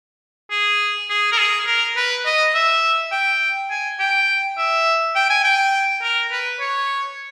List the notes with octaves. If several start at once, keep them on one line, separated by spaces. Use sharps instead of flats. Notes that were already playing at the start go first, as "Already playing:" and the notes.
G#4
G#4
A#4
G#4
A#4
B4
D#5
E5
G5
G#5
G5
E5
G5
G#5
G5
A#4
B4
C#5